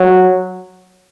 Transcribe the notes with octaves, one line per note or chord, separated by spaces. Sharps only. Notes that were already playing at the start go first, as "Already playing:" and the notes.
Already playing: F#3